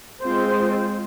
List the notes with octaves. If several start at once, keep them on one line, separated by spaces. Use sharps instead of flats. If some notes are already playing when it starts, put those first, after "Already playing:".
G#3 C4 F4 C5